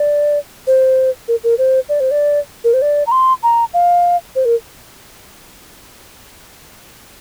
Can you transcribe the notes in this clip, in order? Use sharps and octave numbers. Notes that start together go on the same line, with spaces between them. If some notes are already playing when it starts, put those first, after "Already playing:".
Already playing: D5
C5
A#4
A#4
C5
D5
C5
D5
A#4
C5
D5
A#5
C6
A#5
F5
C5
A#4